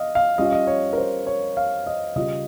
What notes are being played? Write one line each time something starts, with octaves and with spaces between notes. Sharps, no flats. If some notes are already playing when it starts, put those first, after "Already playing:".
Already playing: D#5 F5
F5
G3 C#4 F4 D#5
F5
D#5
C#5
A#4
C5
C#5
F5
D#5
C#3 G3 C#4 F4 D#5